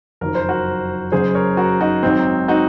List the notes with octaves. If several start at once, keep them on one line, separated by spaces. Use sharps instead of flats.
F#1 F2 D#3 F#3 A#4
C5
F#4 A#4
F#1 F#2 C#3 F#3 G#4 C5
A#4 C#5
F#4 A#4
D#4 F#4
G#1 G#2 F#3 C4 D#4
D#4 F#4